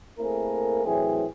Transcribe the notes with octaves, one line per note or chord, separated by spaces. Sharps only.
A3 A#3 C4 E4 G#4 A#4
A2 E3 F#3 C4 G#4